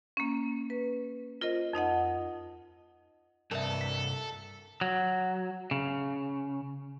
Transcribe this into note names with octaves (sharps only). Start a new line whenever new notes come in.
A#3 C#4
B4
F4 A#4 C5 D#5
F2 D#4 D#5 F#5
C2 G2 A4 A#4 E5
B6
F#3
C#3